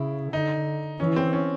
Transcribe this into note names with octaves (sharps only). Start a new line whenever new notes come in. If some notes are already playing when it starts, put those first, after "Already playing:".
Already playing: C#3 E4
D3 D#4
E3 C#4
C4
C#4